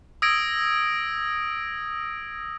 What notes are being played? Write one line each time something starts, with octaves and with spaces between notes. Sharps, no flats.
D#6 E6 G#6 A#6 D7